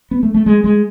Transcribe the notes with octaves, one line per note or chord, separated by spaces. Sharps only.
B3
A3
A3
G#3
G#3